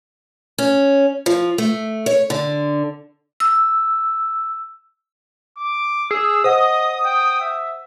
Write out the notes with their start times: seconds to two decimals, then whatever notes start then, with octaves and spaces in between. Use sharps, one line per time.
0.58 C#4
1.26 F3
1.58 A3
2.06 C#5
2.30 D3
3.40 E6
5.58 D6
6.11 G#4 E6
6.44 C5 D#5 F#5 D#6
7.05 G5
7.41 E5